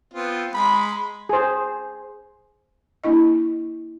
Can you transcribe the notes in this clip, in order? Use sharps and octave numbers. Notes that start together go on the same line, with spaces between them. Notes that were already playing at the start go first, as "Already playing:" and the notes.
B3 C4 F4
G#3 B5
G#4 C5
A#3 D4 E4 D#5